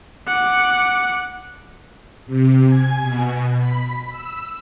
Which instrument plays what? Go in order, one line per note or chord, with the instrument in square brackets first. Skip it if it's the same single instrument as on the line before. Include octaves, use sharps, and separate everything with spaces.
[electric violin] F#5 D6
[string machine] C3
G#5
B2
B5
E6